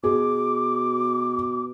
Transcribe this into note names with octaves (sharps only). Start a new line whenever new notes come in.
B2 G#4 D6